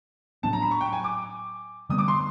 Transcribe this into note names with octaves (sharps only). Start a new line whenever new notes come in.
A2 F#3 B3 D4 A5
A#5
B5
C#6
G5
G#5
D6
D3 G3 B3 D#6
D6
C6